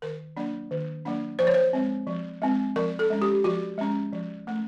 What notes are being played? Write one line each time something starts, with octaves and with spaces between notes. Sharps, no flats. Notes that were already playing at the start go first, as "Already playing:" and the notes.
D#3 A#4
F#3 A#3 D4
D#3
F#3 A#3 D4
F3 C5
C#5
C5
G#3 C4
F3
G#3 C4
F3 A#4
A4
G#3 C#4
G4
F3 F#4
G#3 C#4
F3
A3 C#4